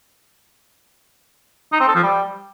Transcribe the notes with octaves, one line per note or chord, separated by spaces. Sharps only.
D#4
C4
A4
F3
G3